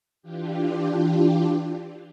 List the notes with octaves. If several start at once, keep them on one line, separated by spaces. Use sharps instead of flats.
E3 D4 F4 G4